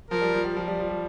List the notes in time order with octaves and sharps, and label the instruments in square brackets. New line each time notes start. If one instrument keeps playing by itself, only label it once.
[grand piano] F3 [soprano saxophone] A#4
[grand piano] G3
F3
G3
F3
G3
F3
G3